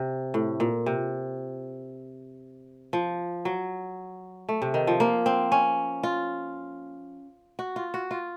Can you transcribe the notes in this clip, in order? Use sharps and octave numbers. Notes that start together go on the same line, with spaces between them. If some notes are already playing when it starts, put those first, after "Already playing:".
Already playing: C3
A2
A#2
C3
F3
F#3
A3
C3
D#3
F3
A#3
C4
C#4
F4
F#4
F4
F#4
F4